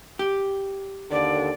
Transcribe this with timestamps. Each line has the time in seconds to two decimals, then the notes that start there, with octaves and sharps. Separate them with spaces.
0.19 G4
1.11 D#2 D3 D5